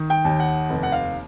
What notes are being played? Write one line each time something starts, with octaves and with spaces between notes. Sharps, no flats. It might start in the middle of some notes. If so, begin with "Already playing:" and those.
Already playing: D#3
G5
D#2
F#5
F1
F#5
F5